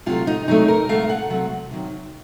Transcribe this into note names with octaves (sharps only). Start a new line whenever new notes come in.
C3 F#3 A3 F4
D#4
C3 F#3 A3 D#4
A#4
C3 F#3 A3 F5
F#5
C3 F#3 A3
C3 D#3 F#3